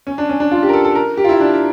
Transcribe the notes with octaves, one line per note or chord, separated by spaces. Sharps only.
C#4
D4
C#4
D4
F4
G4
A#4
A4
A4
A#4
G4
F4
E4
D4